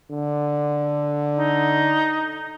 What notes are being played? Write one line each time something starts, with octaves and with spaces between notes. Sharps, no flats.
D3
D#4